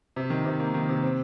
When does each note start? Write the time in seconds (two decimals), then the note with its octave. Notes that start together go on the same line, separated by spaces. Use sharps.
0.16 C3
0.30 D#3
0.45 C3
0.60 A#3
0.74 D#3
0.89 C3
1.03 C4